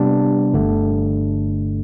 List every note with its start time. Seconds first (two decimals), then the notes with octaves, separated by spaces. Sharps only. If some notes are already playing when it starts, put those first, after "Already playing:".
Already playing: C3 G3 B3 D4
0.53 G1 G2 D3 A3